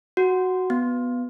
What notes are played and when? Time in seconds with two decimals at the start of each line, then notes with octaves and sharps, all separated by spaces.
0.17 F#4
0.70 B3